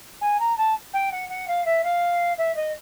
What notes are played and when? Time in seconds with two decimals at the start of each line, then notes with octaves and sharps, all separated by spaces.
0.21 G#5
0.40 A#5
0.58 A5
0.94 G5
1.12 F#5
1.30 F#5
1.48 F5
1.66 E5
1.84 F5
2.38 E5
2.56 D#5